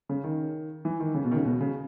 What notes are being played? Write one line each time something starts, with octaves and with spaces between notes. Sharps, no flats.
C#3
D#3
E3
D#3
C#3
B2
D#3
C#3
B2
C#3